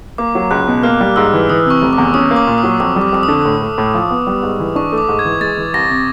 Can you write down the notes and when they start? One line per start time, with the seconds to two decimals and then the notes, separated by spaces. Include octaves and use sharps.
0.18 A#3 D6
0.35 F#3
0.51 C#2 F#6
0.68 B2
0.83 A#3 F6
1.00 G3
1.16 G#2 E6
1.33 E3
1.49 E3 D#6
1.66 C3 C#6
1.82 F1
1.93 D6
1.98 E2
2.14 C#4 D#6
2.31 A#3
2.36 D6
2.47 A#2
2.58 D#6
2.63 F#3
2.80 F2 D6
2.96 G3
3.01 D6
3.13 F2 D6
3.23 D#6
3.28 D3
3.45 A2
3.62 A3
3.78 A2
3.94 F3
4.10 B3
4.27 G3
4.43 G#2
4.59 E3
4.76 D4 C#6
4.92 A3
4.98 D6
5.09 G#2
5.19 G#6
5.25 E3
5.41 G#3 A6
5.57 E3
5.74 C2 A#6
5.90 C3